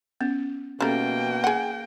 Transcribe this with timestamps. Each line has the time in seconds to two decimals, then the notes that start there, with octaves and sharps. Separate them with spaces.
0.21 B3 C#4
0.81 B2 G3 A3 A#3 C#4 G5 A#5
1.44 G#4 F#5